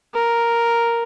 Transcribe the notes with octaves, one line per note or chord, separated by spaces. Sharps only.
A#4